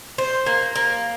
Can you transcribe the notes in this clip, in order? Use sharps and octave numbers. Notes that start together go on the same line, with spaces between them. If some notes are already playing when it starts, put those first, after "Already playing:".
C5
A#3
A#3